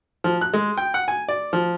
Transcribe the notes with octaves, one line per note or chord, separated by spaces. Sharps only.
F3
F#6
G#3
G5
F#5
G#5
D5
F3